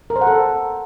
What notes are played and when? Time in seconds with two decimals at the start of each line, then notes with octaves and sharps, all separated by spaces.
0.10 A#4
0.16 C5
0.21 F#5
0.27 A4